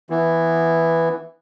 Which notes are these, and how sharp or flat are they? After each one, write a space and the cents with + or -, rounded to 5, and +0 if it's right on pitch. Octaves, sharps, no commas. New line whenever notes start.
E3 +0 B3 +0